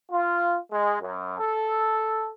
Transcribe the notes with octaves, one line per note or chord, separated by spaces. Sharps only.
F4
G#3
F#2
A4